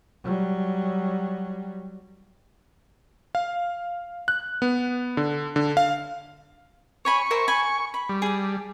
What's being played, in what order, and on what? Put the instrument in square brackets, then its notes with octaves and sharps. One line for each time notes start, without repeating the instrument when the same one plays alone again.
[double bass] F#3 G3
[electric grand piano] F5
F#6
B3
D3
D3
F5
[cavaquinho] C#5 G#5 B5 [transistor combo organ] C#6
[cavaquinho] A#4 C5 E5
G#5 B5
B5
[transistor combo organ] G3
[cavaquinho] G#4 A5